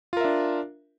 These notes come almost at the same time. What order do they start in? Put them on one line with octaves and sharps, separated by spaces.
F4 A#4 E5 D4